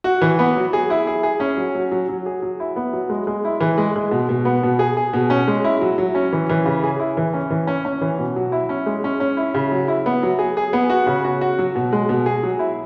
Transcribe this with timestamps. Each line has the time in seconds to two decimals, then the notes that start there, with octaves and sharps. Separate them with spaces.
0.04 F#4
0.22 E3
0.39 B3
0.56 F#3
0.73 G#4
0.90 E4
1.07 G#4
1.23 G#4
1.40 C#4
1.57 F#3
1.75 F#3
1.92 F#3
2.09 F#3
2.26 G#4
2.42 F#3
2.60 E4
2.76 B3
2.93 F#3
3.10 G#3
3.27 G#3
3.45 E4
3.61 E3
3.78 G#3
3.96 G#3
4.11 B2
4.29 B2
4.45 B3
4.63 B2
4.79 G#4
4.97 G#4
5.13 B2
5.30 C#4
5.47 G#3
5.64 E4
5.81 F#3
5.98 F#3
6.15 C#4
6.33 E3
6.50 E3
6.66 C#3
6.83 G#4
7.00 E4
7.17 E3
7.33 C#4
7.51 E3
7.67 C#4
7.85 C#4
8.01 E3
8.18 B2
8.36 F#3
8.52 E4
8.69 C#4
8.86 G#3
9.04 C#4
9.20 C#4
9.37 E4
9.54 C#3
9.72 F#3
9.88 E4
10.06 B3
10.23 F#3
10.39 G#4
10.57 G#4
10.73 B3
10.90 F#4
11.07 C#3
11.24 F#4
11.41 F#4
11.58 F#3
11.75 B2
11.93 G#3
12.09 B2
12.26 G#4
12.43 F#3
12.59 E4